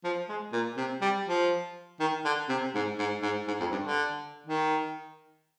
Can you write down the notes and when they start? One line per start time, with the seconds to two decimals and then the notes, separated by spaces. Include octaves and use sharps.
0.04 F3
0.29 G#3
0.53 A#2
0.77 C3
1.01 G3
1.27 F3
2.00 D#3
2.25 D3
2.49 C3
2.75 G#2
2.99 G#2
3.23 G#2
3.47 G#2
3.60 F2
3.72 G2
3.85 D3
4.46 D#3